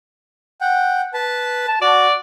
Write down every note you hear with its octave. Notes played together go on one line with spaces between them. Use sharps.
F#5 G5
B4 A5
A5
F#4 D5